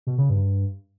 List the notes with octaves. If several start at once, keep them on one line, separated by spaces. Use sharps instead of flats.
B2
C#3
G2